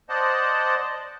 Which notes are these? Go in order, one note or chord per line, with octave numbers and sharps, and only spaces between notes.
C5 D5 D#5 F#5 A5